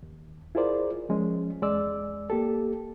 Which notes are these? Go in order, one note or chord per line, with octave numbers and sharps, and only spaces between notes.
D#2
E4 F4 G#4 A#4 C5 D5
F3 G#3 C#4
E2 G#3 D5 E6
A#3 G4 A4